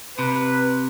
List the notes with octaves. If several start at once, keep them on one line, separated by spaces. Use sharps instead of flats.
C3 B4